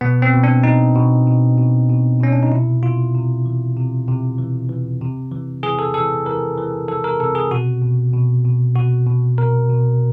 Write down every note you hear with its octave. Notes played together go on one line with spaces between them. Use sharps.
B2 B3
C4
B2
D4
B2 D#4
B2
B2
B2
B2
B2 C#4
D4
D#4
C3 E4
C3 F4
C3
E3
C3
C3
E3
E3
C3
E3
E3 G#4
A4
E3 A4
E3 A#4
E3
E3 A4
A#4
C3 A4
G#4
B2 F#4
B2
B2
B2
B2 F#4
B2
B2 A#4
B2